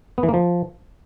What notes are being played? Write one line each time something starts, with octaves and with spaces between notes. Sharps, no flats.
B3
E3
A#3
F3